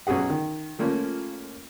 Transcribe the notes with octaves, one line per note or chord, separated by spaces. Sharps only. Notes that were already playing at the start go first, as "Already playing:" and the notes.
B1 C#4 F#4 G#4 F#5
D#3
F3 A3 A#3 C#4 F4